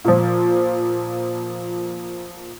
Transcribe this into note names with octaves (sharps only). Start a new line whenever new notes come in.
A#2 F3